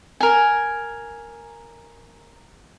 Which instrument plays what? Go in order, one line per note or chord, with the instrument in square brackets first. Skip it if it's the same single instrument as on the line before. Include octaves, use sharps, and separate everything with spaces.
[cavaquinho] A#4 G#5